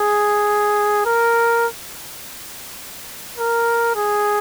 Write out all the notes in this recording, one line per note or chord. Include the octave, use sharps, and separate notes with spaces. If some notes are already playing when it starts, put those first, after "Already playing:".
Already playing: G#4
A#4
A#4
G#4